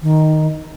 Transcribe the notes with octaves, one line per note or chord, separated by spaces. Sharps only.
D#3